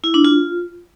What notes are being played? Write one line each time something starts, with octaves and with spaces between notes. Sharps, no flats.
E4
D4
F4